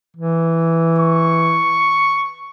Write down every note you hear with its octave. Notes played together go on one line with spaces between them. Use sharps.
E3
C#6